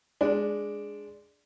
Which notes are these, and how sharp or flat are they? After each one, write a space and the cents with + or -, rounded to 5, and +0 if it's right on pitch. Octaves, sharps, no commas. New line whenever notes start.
G#3 +0 D4 +0